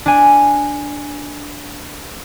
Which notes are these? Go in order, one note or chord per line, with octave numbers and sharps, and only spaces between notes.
D4 G#5